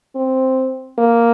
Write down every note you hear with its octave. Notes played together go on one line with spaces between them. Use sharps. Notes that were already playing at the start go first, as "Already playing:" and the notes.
C4
A#3